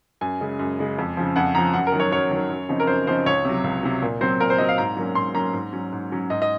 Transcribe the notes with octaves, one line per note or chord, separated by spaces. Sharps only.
F#2 G#5
C#3 G#3
F#2
C#3 G#3
F2
C#3 F3
F2 F#5
C#3 F3 A#5
F#2 F#5
A#4
D#3 F#3
C#5
F#2 C#5
D#3 F#3
F#2
C#3 F3 C4 D#4
A#4
F#2 C5
C#3 F3 C4 D#4 C5
C#2 C#5
C3 F#3
C#2
C3 F#3
A#2
F#3 C4 C5
A#2 A#4
C5
F#3 C4 D#5
F5
G#2 A#5
F#3 A#3 C#4
G#2 C6
F#3 A#3 C#4 A#5
G#2
F#3 C#4
G#2
F#3 C#4
G#2 D#5
D#5